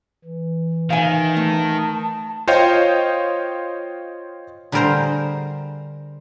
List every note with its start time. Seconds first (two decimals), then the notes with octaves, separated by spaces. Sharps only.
0.25 E3
0.90 D#3 E5 F5 G#5
1.37 A3 A5
2.47 F4 C5 C#5 D#5 F5 G5
4.72 D3 G3 G#4 A#4 C5 A#5